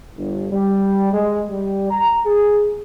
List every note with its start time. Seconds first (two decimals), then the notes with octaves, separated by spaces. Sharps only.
0.18 G1
0.52 G3
1.13 G#3
1.50 G3
1.90 A#5
2.26 G#4